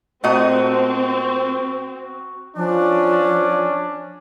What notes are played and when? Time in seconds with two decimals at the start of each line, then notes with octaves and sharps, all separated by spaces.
0.24 A#2 A3 C4 F#4 D#5
2.56 F3 C#4 D4